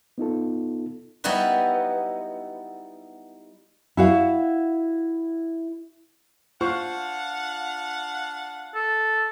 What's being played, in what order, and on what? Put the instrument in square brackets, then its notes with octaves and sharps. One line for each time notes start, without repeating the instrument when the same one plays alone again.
[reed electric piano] B3 D#4 F4 A4
[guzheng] G3 B3 D#4 E4 F#4 B4
[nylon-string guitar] E4 F#4 F5
[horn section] D4 F5 F#5 [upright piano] F4 C5 C#6
[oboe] A4